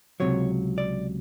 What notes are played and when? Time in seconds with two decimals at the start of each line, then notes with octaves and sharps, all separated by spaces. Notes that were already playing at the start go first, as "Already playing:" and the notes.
0.20 C#2 C3 F#3 C#5
0.78 D5